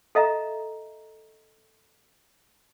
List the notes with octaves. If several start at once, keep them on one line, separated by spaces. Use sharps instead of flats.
A4 D#5 E5 A#5